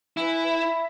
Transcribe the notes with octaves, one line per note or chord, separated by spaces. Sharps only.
E4 B4 G#5
E5 B5